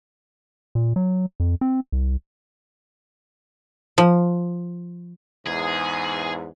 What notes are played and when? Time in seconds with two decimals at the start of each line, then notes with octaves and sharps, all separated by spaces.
0.75 A#2
0.96 F#3
1.40 F2
1.61 C4
1.92 C2
3.98 F3
5.46 E2 G#2 G#4